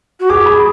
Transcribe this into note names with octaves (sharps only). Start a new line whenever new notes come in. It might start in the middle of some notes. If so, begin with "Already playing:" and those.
F#4
G#4 D6
B5